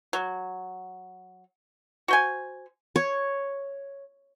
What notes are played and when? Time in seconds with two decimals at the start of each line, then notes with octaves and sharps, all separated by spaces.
0.13 F#3
2.08 F#4 C5 G#5
2.96 C#5